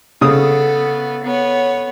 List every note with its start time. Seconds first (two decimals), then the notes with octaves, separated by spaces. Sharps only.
0.21 C#3 B3 A4 D#6
1.23 B3 C#5